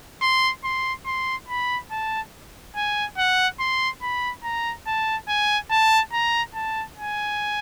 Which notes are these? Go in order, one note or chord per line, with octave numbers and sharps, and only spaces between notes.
C6
C6
C6
B5
A5
G#5
F#5
C6
B5
A#5
A5
G#5
A5
A#5
A5
G#5